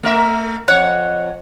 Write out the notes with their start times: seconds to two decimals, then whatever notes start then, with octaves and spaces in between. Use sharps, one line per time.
0.03 A3 A#4 E5
0.68 F2 C#5 F#5